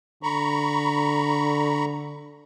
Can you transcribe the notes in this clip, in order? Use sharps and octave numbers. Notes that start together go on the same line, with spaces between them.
D3 A#5 B5 C#6